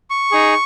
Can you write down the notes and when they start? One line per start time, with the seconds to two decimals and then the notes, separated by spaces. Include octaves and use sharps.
0.10 C#6
0.32 D#4 G#4